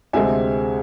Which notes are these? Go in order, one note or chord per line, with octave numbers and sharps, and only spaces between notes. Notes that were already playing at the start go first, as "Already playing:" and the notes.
D2 C3 G#3 C4 E5 G#5